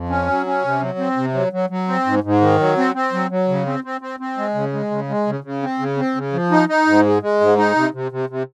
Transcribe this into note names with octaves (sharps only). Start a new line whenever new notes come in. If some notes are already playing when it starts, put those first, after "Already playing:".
Already playing: F2
C#4
F#3
C#4
C3
F#3
C4
C3
F#3
F#3
F#3
C4
G#2
G#2
D#3
F#3
C4
C4
F#3
F#3
C#3
C4
C4
C4
C4
G#3
C#3
G#3
C#3
G#3
C#3
C#3
C4
C#3
C4
C#3
F3
D#4
D#4
G#2
G#3
G#3
G#2
D#4
C3
C3
C3
C3